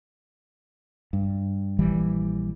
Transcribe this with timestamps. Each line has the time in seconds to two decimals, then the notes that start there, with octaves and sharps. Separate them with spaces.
1.13 G2
1.79 A#1 E3 G3